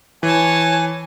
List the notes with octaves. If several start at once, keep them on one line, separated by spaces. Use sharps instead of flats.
E3 C#5 G#5 A5